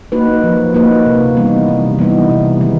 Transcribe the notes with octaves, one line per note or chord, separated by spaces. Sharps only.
A#3 D#4 F#4 B4
F3
A#3 D#4 F#4 B4
C3
E3 G3 B3 D#4
C3
E3 G3 B3 D#4
C3
D#3 G#3